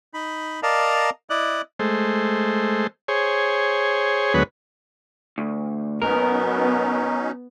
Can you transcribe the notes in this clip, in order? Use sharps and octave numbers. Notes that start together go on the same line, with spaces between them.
D#4 B5
A#4 D5 D#5 F5 A5 A#5
E4 D5 D#5 F#6
G#3 A3 C5
G#4 C5 C#5
D2 F#3 G#3 B3 B4 C#5
D2
F#3 B3 C#4 D#4 A#4